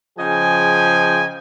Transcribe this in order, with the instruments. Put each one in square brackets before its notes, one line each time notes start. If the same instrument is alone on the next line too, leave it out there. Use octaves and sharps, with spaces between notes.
[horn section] C#3 F3 G#4 D#5 G5 G#5